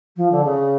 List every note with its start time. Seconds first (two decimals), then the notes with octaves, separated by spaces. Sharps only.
0.16 F3
0.31 D3
0.44 C#3